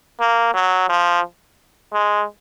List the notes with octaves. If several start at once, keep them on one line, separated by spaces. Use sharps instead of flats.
A#3
F#3
F3
G#3